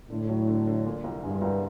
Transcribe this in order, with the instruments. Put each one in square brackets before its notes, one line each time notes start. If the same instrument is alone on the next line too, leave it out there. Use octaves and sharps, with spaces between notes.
[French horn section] A2 [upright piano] D3
[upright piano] F#3
D3
D3
A#2
C2
[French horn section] G2 [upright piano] G#3
[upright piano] C2